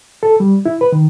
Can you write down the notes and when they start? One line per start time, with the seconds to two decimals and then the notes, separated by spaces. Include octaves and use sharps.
0.23 A4
0.40 G3
0.66 E4
0.81 B4
0.92 D#3